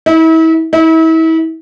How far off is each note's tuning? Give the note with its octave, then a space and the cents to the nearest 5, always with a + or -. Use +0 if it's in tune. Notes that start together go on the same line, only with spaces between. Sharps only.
E4 -35
E4 -35